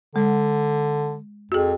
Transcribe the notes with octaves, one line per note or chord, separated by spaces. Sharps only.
D3 G#3
F2 F#4 G#4